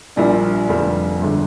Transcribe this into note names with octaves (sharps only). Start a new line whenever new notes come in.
A#1 A#2 G3 D4
F1 F2 D3 G3
G1 D3 G#3